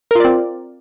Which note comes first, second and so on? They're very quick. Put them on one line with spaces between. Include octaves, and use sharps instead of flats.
A#4 F4 D5 C4